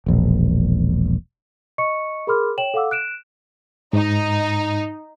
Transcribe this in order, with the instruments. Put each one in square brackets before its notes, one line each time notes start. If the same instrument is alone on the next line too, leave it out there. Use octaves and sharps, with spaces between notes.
[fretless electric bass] E1 A#1
[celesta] D#5 C#6 C#7
G#4 A#4 B5 C6 D6 F6
C#5 G5 E7 F#7
A4 F5 F#5 D6 E6
F#6 D7 E7
[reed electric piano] G#2 [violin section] D#4